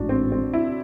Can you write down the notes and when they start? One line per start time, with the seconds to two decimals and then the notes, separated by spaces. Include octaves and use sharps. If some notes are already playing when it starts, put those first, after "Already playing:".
Already playing: A1 G#2 E3 D4 F#4
0.09 C4
0.32 C4
0.53 E4